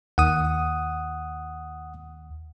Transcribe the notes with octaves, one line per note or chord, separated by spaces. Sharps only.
D#2 F#5 D#6